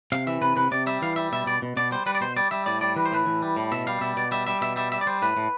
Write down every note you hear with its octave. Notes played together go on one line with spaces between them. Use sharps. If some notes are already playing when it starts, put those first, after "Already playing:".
C3 F5
E3 E5
C3 B4
C3 B4
C3 D5
G3 E5
E3 F5
G3 E5
B2 E5
B2 D5
B2
B2 D5
G3 C5
G3 B4
D5
B2 C5
G3 D5
G3 E5
A2 D5
G3 D5
E3 B4
C5
A2 B4
E3
G3
A2
B2 E5
G3 F5
B2 E5
B2 D5
G3 E5
G3 E5
B2 E5
G3 E5
G3 E5
D5
G3 C5
A2 B4
A2